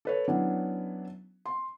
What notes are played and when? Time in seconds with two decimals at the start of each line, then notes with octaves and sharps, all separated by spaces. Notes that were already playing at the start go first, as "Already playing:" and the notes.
0.05 A4 B4 C#5
0.28 F#3 B3 C#4 D4 E4
1.46 C6